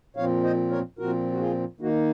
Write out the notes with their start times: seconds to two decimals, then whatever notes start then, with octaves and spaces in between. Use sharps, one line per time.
0.16 A#2 F3 C4 C#5 F5
0.44 C5 D#5
0.71 A#4 C#5
0.99 A#2 F3 C4 F#4 A#4
1.32 F#4
1.40 F4 G#4
1.80 D#3 A#3 D#4 F#4